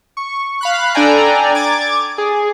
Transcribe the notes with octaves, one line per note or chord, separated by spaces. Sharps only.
C#6
F5 B5 F#6
D4 A4 D5 G5 G#5 A#5
D6 G#6 A6
G#4